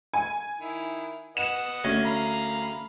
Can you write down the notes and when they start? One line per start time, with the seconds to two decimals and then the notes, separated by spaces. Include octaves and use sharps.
0.13 G#5
0.60 D#3 E4
1.37 B4 D#5 F#5 E7
1.84 D2 C#4 G#5 A#6
2.05 F5 A#5 B5